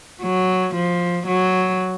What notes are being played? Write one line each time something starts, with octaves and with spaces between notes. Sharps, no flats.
F#3
F3
F#3